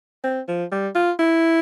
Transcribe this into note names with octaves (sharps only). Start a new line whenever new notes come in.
C4
F3
G3
F4
E4